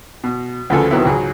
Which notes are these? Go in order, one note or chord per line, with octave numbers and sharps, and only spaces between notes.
B2
D2 C#3 F3 A4 B4 G#5
B2 D#3 F#3 B3 C4 E4
C#2 G#2 F#3 G#4